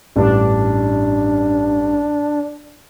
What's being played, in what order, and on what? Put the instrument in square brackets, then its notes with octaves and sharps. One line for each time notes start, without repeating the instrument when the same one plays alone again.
[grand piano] A1 G2 G3 [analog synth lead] D4